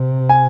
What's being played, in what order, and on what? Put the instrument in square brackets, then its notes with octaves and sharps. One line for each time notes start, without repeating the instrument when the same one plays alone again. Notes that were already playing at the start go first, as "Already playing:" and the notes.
Already playing: [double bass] C3
[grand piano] G#5